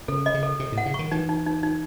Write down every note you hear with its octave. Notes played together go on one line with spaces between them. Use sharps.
C#3 A4
D#5
C#3
A4
C3 A4
A2
F#5
C#3
D#3 C#6
E3 D#4
D#4
D#4
D#4